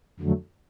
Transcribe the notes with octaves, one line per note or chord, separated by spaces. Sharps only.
F2 D3 F#3 A3